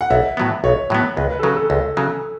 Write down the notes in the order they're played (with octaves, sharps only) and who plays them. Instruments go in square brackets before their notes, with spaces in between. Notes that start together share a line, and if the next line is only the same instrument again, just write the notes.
[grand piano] F#5
[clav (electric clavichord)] B1 [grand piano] E5
[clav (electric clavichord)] A2 F#3 B3
[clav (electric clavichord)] B1 [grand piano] C#5
[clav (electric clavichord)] A2 F#3 B3
[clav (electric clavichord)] C#2 [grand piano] B4
[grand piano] B4
A4
[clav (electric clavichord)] C#3 F#3 [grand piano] B4
[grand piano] A4
[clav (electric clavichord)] C#2
C#3 F#3